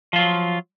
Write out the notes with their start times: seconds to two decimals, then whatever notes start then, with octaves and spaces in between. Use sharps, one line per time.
0.13 F3
0.16 F4
0.18 F#3